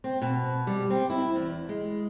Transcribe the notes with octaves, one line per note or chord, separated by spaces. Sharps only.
C4
B2
G3
C4
E4
E2
G#3